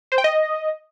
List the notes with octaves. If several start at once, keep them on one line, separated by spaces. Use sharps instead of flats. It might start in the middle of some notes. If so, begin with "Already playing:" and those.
C5
G5
D#5